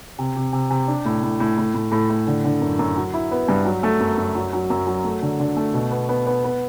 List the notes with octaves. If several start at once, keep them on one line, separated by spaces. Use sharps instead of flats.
C3
C3
C3
C3
D4
A2
A2
A2
A2
A2
A2
A2
D3
D3
F#2
F#2
F#3
E4
B3
G2
F#3
A3
F#2
F#2
F#3
F#3
F#2
F#3
A3
D3
D3
A3
B2
B3
B3
B3
B3